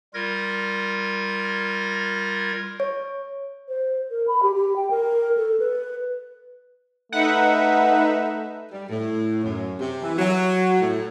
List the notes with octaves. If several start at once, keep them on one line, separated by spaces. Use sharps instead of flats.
G3 F4 A#4 G#6 A#6
C#5
C5
A#4
B5
G4
G4
G5
A#4
A4
B4
A3 D#4 B4 E5 F#5
G3
A2
F#2
C3
E3
F#3
A2